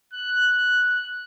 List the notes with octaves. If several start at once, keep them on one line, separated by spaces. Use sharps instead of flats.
F#6